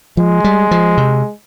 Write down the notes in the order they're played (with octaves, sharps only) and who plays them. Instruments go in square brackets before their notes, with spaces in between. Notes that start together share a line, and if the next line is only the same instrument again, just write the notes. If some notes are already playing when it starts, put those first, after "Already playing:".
[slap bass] F3 [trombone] G#3
[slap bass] G3
F3
C3